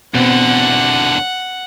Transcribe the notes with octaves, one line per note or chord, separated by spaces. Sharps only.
E2 B2 D3 C4 F#5